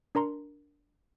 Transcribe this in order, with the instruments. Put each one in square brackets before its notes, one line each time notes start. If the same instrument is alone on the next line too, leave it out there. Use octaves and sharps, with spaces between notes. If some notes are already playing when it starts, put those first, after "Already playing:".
[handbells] D4 A#4 A#5 C6